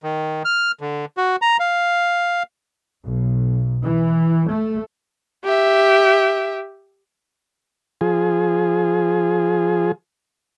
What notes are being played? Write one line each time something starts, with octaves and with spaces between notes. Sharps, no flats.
D#3
F6
D3
F#4
A#5
F5
B1
E3
A3
G4 E5
F3 G#4